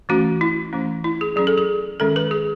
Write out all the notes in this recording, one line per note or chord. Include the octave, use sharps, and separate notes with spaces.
E3 A3 C#4 F#4
E4
E3 A3 C#4
E4
G#4
F#3 C#4 G#4
A4
G#4
D#3 G#3 C#4 A4
B4
G#4